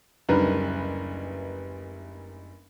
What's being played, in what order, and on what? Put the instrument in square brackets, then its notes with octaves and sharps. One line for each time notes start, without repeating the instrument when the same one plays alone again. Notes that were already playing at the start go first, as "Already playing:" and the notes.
[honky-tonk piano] F#1 D2 G3 D#4 A#4 B4